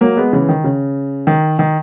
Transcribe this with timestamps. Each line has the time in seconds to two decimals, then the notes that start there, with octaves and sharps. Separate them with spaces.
0.01 F#3 A#3
0.17 G#3 B3
0.33 C#3 E3
0.49 D#3
0.64 C#3
1.27 D#3
1.59 D#3